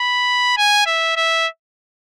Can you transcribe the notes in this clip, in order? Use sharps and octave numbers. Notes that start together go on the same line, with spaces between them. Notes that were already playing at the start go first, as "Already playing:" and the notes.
Already playing: B5
G#5
E5
E5